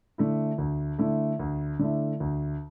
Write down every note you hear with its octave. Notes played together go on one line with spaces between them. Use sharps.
D3 A3 E4
D2
D3 A3 E4
D2
D3 A3 E4
D2